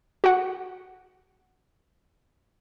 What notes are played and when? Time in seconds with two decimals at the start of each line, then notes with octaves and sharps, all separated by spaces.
0.24 F#4 F#5